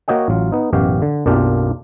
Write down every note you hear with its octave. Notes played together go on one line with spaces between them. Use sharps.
A#3 F#4 C#5 D#5 G5
A1 F#3 F4
B3 D#4
A1 F#2 B2 F#4 G4 F5
D3
B1 F#2 A#3 D4 F4 G4